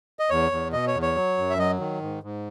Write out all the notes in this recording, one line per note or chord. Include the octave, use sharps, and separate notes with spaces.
D#5
E2 C#5
E2
B2 D#5
C#5
E2
C#5
F#3
F#2
E5
F#3 D#5
D#3
G#2
G#2